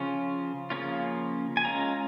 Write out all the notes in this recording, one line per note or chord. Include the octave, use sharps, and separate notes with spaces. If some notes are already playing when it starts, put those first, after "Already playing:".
Already playing: C#3 F3 C#4 F4
C#3 F3 A#3 C#4 F4
G#5
G#3 C#4 F4 A#5